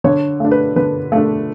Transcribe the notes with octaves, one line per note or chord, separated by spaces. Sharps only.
D3 C#5
A3 D4
B4
D3 B4
A3 D4